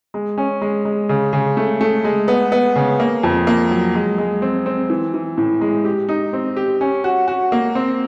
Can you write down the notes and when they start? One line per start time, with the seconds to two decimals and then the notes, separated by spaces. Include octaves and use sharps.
0.14 G#3
0.38 C#4
0.62 G#3
0.85 G#3
1.09 C#3
1.33 C#3
1.57 A3
1.81 A3
2.04 G#3
2.28 B3
2.52 B3
2.76 C#3
3.00 A#3
3.23 F2
3.47 A#3
3.71 F#3
3.95 G#3
4.18 G#3
4.42 C4
4.66 C4
4.90 E3
5.14 E3
5.38 A2
5.61 G#3
5.85 G4
6.09 D#4
6.33 C4
6.57 G4
6.81 C#4
7.04 F#4
7.28 F#4
7.52 A#3
7.75 C4